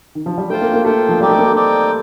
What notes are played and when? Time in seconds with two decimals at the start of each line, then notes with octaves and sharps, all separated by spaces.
0.15 D#3
0.26 F3
0.38 G3
0.50 A3 F4 C5 G5
0.61 A#3
0.73 A#3
0.85 A3 F4 C5 G5
1.09 F3
1.20 G3 C4 D#4 G4 D5 G5
1.30 A3
1.39 A#3
1.47 A3
1.56 C4 D#4 G4 D5 G5